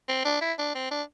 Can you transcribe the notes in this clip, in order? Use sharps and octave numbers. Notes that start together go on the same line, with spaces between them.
C4
D4
E4
D4
C4
D4